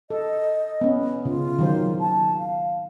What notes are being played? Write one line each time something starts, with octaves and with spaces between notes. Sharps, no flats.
A4 D#5
B3 C#4
C#3 F4
D#3 F#3 C5
A5
F5